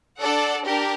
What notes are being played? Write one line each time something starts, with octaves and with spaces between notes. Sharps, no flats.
D4 A4 D5 F#5
D4 G4 A#4